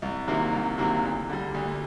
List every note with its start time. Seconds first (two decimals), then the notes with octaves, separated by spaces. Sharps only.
0.02 C2
0.28 C3 D#3 F#3 A#3
0.53 C2
0.78 C3 D#3 F#3 A#3
1.03 D2
1.29 D3 G3
1.54 D2